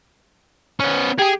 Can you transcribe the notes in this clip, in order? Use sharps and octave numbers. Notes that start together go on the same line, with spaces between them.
B3 C#4
G4 G#4 G#5